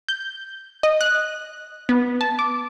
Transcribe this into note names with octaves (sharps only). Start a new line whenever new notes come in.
G6
D#5
F#6
B3
A5
D6